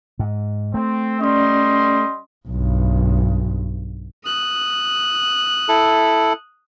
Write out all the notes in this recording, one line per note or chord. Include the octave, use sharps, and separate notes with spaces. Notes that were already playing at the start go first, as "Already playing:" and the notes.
G#2
A3 C4
G3 C#4 D5 D#5 C6
B1 G2
D#6 F#6
E4 A4